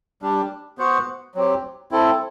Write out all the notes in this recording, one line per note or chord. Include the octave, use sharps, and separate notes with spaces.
G3 D4 G4
B3 F#4 C5 F#5
F#3 C4 G4
C4 E4 A4